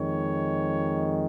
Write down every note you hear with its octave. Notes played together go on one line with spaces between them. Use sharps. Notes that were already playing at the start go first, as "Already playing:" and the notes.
Already playing: F2 D#3 G#3 C#5